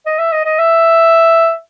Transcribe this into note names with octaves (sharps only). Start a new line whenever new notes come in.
D#5
E5
D#5
D#5
E5